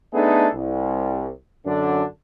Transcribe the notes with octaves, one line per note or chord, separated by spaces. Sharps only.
A3 B3 D4 D#4 G#4 A4
C2
F#2 D3 D4